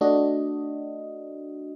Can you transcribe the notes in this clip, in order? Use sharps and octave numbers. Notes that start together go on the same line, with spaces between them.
A3 D4 F#4 D#5